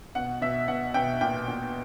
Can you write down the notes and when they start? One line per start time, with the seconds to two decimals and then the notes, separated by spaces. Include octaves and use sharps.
0.15 B2 F#5
0.41 B2 E5
0.68 B2 F#5
0.94 B2 G5
1.21 A#2 G5
1.48 A#2